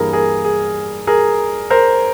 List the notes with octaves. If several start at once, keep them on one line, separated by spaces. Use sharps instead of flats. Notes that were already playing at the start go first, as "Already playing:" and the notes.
Already playing: G2 E3 G3 A#3 G#4 A#4
G#4 A#4
G#4
G#4 A#4
A#4 C5